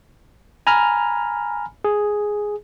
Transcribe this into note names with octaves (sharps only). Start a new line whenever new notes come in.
G#5 A#5 B5 F6
G#4